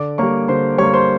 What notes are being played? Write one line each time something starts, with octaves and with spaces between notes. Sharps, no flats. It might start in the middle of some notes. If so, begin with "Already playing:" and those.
Already playing: D3 D5 D6
G3 A#3 C#5 C#6
D3 C5 C6
G3 A#3 C#5 C#6
C5 C6